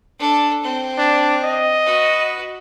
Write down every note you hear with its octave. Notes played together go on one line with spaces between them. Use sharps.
D4 A4
C4
D4
D#5
F#4 B4